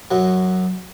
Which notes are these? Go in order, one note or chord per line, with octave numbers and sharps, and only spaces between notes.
F#2 F#3